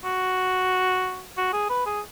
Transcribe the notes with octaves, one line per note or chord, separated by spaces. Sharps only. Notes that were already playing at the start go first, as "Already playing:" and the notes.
F#4
F#4
G#4
B4
G#4